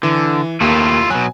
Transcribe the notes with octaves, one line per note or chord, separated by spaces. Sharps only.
D3 E3
D#2 A3 A#3 E4 F4 G4
B2 F#3 G#5